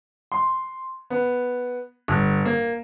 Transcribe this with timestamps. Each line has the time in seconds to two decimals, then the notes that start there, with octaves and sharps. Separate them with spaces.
0.32 C6
1.10 B3
2.08 G1
2.45 A#3